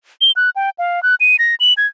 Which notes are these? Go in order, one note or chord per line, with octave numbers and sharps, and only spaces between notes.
G7
F#6
G5
F5
F#6
D#7
A#6
F#7
G#6